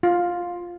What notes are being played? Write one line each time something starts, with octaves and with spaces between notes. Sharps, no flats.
F4